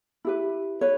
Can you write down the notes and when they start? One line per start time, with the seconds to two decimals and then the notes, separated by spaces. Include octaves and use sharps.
0.25 E4 G4 B4
0.81 B4 C#5